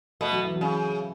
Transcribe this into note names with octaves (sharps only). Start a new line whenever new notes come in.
B2 A3 B3
F#3
E3
F#3
C#3